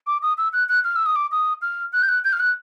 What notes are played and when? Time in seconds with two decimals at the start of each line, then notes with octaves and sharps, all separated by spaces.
0.07 D6
0.22 D#6
0.38 E6
0.53 F#6
0.69 F#6
0.84 F6
0.96 E6
1.06 D#6
1.16 D6
1.32 D#6
1.62 F6
1.93 F#6
2.03 G6
2.08 F#6
2.24 G6
2.33 F6
2.39 F#6